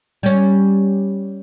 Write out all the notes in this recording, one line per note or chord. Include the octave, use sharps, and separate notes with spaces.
G3 C#4